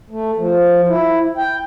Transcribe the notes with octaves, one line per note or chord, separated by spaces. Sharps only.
A3
F3
E4
G5